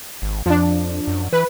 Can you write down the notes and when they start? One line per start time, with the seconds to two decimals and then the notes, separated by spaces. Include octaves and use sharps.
0.22 G#1
0.46 F2 F3 D4
1.07 F#2
1.33 E3 B4